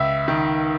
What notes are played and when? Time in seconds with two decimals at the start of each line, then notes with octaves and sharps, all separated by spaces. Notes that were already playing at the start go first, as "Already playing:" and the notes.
Already playing: C#2 E5
0.28 D#3